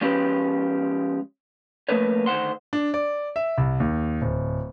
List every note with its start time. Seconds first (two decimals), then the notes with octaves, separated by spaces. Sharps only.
0.01 F3 G#3 C#4 G4 B4
1.89 F3 A3 A#3 B4 C#5
2.26 D2 D#3 C5 F#5 C6
2.73 D4
2.94 D5
3.36 E5
3.58 C2
3.80 D#2
4.21 D1